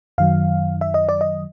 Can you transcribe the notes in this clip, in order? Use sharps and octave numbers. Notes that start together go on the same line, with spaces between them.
F#2 D#3 F#3 F5
E5
D#5
D5
D#5